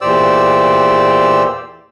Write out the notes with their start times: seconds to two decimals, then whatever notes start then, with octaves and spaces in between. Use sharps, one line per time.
0.01 E2 A#2 G4 C5 D5 E6